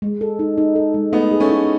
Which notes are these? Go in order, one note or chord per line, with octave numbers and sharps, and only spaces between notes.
G#3
A4
D#4
D#4
A4
G#3
A3 B3 D#4
G#4
A3 C#4
E4